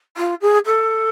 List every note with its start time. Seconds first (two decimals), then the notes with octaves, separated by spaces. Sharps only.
0.17 F4
0.41 G#4
0.66 A4